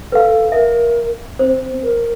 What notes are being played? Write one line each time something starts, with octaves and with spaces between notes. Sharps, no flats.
A4 B4 F5
A#4 E5
C4 C5
A#4